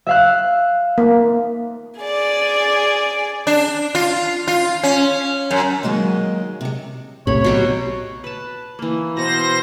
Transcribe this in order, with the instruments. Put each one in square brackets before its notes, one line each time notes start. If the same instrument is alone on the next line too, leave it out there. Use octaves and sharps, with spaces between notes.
[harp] E5 F5 F#6
[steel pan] A#3
[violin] G#4 D5
[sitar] D4
F4
F4
C#4
F#2
[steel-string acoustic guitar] D#3 F#3 G#3 A#3 D#5
C3 G#3
[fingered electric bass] B1 A2 C3 [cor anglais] C#5 [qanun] B5
[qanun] B2 F#3 G4
B4 A5
E3 A#3
[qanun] B2 F#5 [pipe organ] C5 A#6